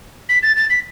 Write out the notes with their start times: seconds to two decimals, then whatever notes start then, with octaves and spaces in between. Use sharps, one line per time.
0.29 B6
0.43 A6
0.56 A6
0.70 B6